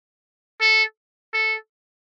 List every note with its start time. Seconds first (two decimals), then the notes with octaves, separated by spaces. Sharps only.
0.61 A4
1.34 A4